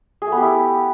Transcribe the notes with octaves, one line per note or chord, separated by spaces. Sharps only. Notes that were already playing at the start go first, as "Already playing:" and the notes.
G#4
A3
B3
G4
E4